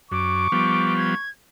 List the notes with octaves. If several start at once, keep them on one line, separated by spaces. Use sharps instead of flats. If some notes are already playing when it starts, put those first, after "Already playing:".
F#2 C#6 D6
F3 G3 B3
G#6